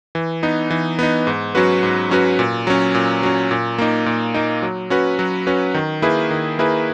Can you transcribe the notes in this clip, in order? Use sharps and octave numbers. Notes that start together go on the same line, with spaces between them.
E3
B3 D#4
E3
B3 D#4
G#2
F#3 C#4 F#4 B4
G#2
F#3 C#4 F#4 B4
A#2
F#3 C#4
A#2
F#3 C#4
A#2
A#3 D#4
A#2
A#3 D#4
F#3
C#4 F#4 B4
F#3
C#4 F#4 B4
D#3
A#3 E4 G#4 B4
D#3
A#3 E4 G#4 B4